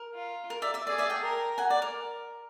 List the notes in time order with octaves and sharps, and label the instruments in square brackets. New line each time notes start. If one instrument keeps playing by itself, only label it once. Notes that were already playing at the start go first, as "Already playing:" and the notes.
Already playing: [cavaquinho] A#4
[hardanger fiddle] F4
[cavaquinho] A#4
D5 E5
D5 E5
[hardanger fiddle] G#4 [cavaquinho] D5
[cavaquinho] D5 E5
G5 A5
[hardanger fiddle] A#4
[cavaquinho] F#5 G#5
D5
A#4